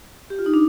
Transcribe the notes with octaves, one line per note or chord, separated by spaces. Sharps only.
G4
F4
D#4
D4